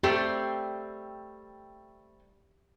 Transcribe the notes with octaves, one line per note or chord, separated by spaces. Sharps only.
G3 A3 C4 G4